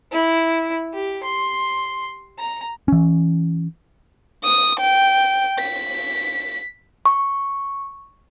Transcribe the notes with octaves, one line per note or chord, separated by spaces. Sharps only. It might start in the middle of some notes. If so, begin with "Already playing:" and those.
E4
G4
C6
A#5
E3 C#4
D#6
G5
B6
C#6